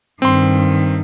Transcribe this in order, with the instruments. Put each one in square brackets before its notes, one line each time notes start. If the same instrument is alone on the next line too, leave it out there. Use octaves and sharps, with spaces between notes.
[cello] G2 D#3 [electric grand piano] C4 C6